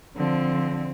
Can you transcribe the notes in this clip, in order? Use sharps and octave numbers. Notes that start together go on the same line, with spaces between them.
D3 F3 C4